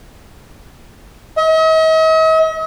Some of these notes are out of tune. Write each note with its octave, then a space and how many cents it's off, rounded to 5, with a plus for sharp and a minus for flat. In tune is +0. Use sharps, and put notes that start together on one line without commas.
D#5 +45